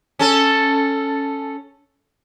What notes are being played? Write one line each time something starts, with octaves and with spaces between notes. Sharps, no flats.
C#4 A4